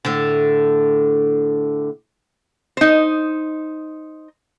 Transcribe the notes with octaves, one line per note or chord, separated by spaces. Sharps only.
A2 D3
D#4 C5